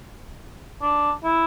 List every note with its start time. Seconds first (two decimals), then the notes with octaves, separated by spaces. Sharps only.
0.82 D4
1.24 E4